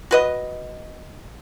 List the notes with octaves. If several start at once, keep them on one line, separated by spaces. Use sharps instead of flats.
F#4 B4 D#5